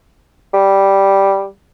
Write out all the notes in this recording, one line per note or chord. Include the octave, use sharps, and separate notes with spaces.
G3